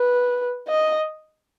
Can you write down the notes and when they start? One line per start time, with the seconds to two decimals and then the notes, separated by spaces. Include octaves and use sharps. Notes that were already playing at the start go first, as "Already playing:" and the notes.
Already playing: B4
0.68 D#5